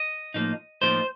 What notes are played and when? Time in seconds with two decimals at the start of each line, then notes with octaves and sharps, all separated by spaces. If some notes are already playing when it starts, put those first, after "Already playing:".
Already playing: D#5
0.34 A2 F3 A#3 D#4
0.82 A2 F3 A#3 D#4 C5